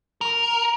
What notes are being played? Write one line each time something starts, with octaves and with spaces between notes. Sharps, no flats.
A#4